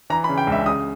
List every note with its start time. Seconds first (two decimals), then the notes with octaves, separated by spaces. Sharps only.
0.10 E3 A#5
0.24 B5
0.29 C#3
0.38 G5
0.47 C#2
0.52 E5
0.66 C#3 D#6